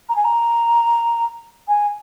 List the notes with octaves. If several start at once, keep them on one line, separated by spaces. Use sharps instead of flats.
A#5
G#5
A#5
G#5